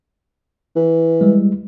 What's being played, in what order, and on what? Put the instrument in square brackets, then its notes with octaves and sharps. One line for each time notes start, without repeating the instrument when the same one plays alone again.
[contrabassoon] E3
[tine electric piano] G3 G#3